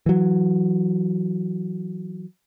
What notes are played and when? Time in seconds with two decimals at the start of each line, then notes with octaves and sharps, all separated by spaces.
0.06 E3 F#3